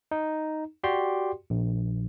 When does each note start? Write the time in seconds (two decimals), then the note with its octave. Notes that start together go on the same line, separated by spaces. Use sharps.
0.11 D#4
0.84 F#4 G4 D5 G5 C6
1.50 A#1